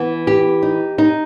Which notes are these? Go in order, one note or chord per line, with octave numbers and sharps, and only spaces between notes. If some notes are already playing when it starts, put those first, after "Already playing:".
Already playing: E3 B3
G4
D#4
D#4